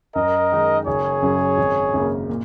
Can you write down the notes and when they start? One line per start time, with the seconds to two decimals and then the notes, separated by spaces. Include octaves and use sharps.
0.16 F#2 A#4 D#5
0.52 D#3 G#3 D#4
0.87 F#1 G#4 C#5
1.22 F#2 C#3 F#3 C#4
1.58 G#1
1.94 F#2 C#3 A#3
2.30 A#2